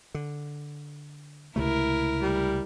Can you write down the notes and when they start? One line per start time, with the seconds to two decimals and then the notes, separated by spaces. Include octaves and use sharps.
0.14 D3
1.56 C#2 C3 A3 E4 A#4
2.22 G3